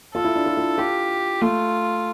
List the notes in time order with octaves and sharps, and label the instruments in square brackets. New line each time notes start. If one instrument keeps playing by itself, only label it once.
[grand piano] F4 [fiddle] A4
[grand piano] E4
D4
F4
F4
[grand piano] F4 [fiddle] G4
[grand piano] A3 [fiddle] F4